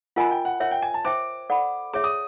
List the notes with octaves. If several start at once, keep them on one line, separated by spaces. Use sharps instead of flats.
F4 A#4 D#5 F#5 G#5 B5
G5
F#5
A#4 C#5 E5 F#5
G5
G#5
A5
C5 E5 G5 D6
A4 D5 F#5 B5
G#4 C#5 E5 D6
D#6